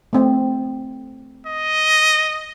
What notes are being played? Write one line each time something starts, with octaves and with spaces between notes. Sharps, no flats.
A3 C4
D#5